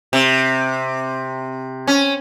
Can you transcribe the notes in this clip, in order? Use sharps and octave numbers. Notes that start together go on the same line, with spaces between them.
C3
C#4